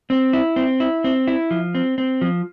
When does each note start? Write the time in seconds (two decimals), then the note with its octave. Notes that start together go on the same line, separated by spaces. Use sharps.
0.10 C4
0.33 E4
0.56 C4
0.80 E4
1.04 C4
1.28 E4
1.51 F3
1.75 C4
1.98 C4
2.21 F3